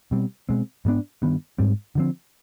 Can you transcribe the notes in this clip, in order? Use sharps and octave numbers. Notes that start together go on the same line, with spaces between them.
B2 G3 C4
B2 G#3 C4
G#2 G3 B3 D4
G2 D#3 B3
G#2 G3 C4
D3 F3 C4